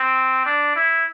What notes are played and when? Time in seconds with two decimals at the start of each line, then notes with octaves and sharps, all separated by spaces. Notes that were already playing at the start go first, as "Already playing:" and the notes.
Already playing: C4
0.46 D4
0.76 E4